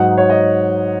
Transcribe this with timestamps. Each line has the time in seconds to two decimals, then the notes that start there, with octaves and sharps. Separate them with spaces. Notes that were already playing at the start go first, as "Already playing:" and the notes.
Already playing: G#2 F#3 D#4 F#5
0.18 C#5
0.30 D#5